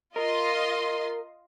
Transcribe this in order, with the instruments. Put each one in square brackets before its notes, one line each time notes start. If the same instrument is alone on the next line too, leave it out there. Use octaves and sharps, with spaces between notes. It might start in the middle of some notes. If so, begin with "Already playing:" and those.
[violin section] F4 D#5 C6 [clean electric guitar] A#4